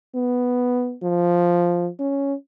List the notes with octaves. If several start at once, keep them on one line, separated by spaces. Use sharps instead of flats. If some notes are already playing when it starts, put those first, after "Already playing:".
B3
F3
C#4